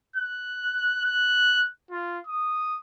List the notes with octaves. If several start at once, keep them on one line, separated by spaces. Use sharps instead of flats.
F#6
F#6
F4
D#6